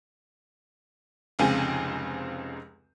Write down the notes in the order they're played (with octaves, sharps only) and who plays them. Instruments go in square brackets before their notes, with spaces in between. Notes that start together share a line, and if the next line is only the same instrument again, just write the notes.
[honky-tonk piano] F1 C#2 C#3 C4 G5 G#5